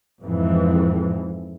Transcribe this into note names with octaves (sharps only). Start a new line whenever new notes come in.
F2 G#2 E3